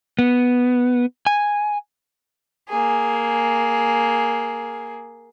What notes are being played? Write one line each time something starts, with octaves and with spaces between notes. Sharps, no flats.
B3
G#5
A#3 G#4